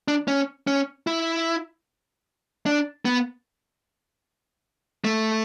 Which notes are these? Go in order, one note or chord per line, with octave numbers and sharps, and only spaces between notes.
D4
C#4
C#4
E4
D4
B3
A3